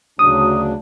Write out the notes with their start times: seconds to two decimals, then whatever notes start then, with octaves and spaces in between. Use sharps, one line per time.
0.19 D2 C#3 F#3 D4 D#6